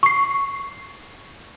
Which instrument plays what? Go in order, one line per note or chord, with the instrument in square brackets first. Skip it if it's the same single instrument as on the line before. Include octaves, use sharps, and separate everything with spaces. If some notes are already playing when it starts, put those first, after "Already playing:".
[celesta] C#6 C7